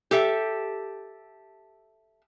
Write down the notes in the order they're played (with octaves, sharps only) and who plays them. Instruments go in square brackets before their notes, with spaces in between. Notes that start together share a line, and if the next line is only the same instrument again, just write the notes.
[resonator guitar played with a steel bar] G4 A4 E5